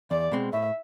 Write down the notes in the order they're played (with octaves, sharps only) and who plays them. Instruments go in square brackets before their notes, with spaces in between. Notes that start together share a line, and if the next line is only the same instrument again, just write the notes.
[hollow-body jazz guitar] E2 [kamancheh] D5
[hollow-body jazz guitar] B2 G#3 C4
[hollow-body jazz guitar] A2 [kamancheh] E5